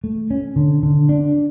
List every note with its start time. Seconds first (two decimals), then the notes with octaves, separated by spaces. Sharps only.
0.04 A3
0.31 C#4
0.56 D3
0.83 D3
1.09 D4